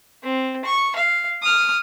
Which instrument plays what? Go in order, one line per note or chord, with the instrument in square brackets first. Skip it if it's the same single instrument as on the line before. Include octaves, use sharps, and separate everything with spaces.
[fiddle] C4
C#6
F5
D#6 F6